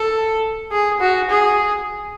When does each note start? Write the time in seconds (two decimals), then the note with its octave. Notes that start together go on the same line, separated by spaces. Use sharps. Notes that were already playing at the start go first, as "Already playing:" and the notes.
Already playing: A4
0.71 G#4
1.00 F#4
1.30 G#4